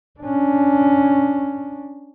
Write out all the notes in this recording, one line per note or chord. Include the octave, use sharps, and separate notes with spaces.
C#4 D4